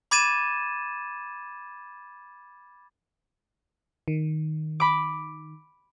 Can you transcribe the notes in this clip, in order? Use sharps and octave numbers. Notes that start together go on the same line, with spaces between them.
B5 D6 G#6 A6 D#7 E7
D#3
B5 D6